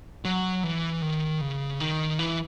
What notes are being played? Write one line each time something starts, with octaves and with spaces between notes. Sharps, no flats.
F#3
E3
D#3
C#3
D#3
E3